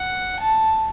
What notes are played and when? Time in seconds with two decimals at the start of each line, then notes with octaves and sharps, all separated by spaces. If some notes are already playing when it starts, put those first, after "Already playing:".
Already playing: F#5
0.40 A5